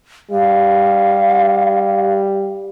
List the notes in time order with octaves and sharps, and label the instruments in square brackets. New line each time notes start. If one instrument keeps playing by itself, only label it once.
[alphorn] G3 [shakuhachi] F5